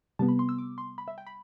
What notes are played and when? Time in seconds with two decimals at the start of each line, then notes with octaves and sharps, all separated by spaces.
0.19 C3 G3 B3 A5
0.29 B5
0.39 C6
0.49 E6
0.58 D6
0.78 C6
0.98 B5
1.08 E5
1.18 G5
1.27 B5